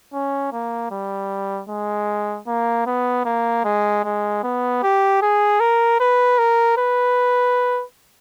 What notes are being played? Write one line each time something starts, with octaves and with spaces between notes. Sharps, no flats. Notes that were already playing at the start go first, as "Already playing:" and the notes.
C#4
A#3
G3
G#3
A#3
B3
A#3
G#3
G#3
B3
G4
G#4
A#4
B4
A#4
B4